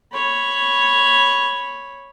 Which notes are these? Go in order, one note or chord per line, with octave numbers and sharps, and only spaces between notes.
C#5 B5